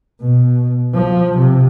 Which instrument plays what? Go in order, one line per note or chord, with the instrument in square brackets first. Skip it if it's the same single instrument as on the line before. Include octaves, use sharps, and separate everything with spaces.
[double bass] B2
F3
C3